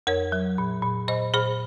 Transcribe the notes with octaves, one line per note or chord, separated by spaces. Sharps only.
F2 A#4 C#5
F#3
A#2
A#2
A#2 C5 D#5
A#2 G#4 C5